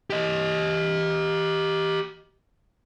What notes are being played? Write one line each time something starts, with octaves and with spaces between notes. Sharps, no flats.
G4 D#5